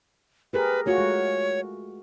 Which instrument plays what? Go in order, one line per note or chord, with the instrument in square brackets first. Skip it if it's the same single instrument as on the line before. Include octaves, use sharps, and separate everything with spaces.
[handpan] G4 G#4 A#4 [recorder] B4
[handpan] A3 F4 F#4 [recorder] C#5
[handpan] G#3